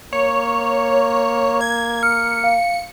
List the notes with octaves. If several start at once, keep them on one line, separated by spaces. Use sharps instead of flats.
A#3 C#5
G#6
F6 C#7
F5